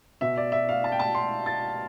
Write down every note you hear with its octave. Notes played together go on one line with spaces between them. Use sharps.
B2 E5
D5
E5
F5
A5
G5
A5
C6
A6